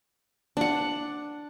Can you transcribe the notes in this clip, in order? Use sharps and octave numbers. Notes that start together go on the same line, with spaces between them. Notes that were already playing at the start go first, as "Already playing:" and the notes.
D4 F#5